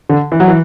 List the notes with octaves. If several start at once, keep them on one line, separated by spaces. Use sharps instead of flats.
D3
E3
F#3
E3